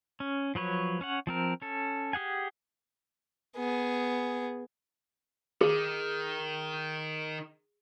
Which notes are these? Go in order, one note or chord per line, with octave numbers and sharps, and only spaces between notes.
C#4
F3 F#3 B4 C#5
C#4 C#5 F#5
F3 C4 A#4
C#4 A4
G4 G#4 F#5 G#5
B3 G#4
D#3 G#4